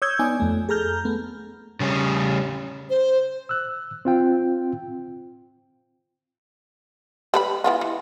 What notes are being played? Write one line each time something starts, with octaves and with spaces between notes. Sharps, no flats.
C#5 D#6 E6 G6 G#6
B3 D#4 D5 G#5
F2 A3
G#4 A4 A#5 F6 G6
A3 B3
C#3 G3 C#4
C5
E6 F#6
C4 F4 G5
G3 B4 B5
E3 B3 F4
E3